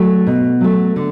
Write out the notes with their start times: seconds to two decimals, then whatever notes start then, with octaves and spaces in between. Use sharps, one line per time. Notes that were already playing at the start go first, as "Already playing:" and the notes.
Already playing: F#3 A3
0.27 B2
0.61 F#3 A3
0.96 D3